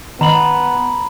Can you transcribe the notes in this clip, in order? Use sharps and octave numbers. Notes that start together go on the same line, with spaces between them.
D#3 B3 A#5 B5 F#7